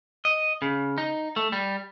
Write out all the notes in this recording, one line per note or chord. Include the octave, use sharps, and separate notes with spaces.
D#5
C#3
D#4
A3
G3